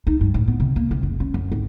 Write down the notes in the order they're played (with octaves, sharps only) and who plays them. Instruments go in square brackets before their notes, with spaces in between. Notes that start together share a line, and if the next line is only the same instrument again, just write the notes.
[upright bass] D#4
G2
A2
B3
C3
A#3
C3
F#1
C#4
F#2
G#1